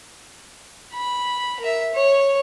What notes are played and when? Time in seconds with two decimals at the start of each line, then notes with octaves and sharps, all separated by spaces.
0.94 B5
1.60 A#4 E5
1.94 C#5